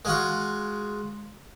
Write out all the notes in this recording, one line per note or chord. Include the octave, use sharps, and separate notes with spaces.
G#3 F4 F#4